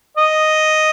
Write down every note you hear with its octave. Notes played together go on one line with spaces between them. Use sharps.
D#5